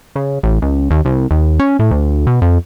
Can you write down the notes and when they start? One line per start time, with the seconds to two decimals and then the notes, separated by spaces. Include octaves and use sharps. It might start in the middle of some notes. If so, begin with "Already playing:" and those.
0.16 C#3
0.43 A1
0.62 C#2
0.91 D#2
1.05 C2
1.31 D#2
1.60 C#4
1.79 A2
1.91 D2
2.27 B2
2.42 F2